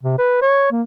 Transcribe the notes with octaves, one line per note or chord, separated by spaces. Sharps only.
C3
B4
C#5
A#3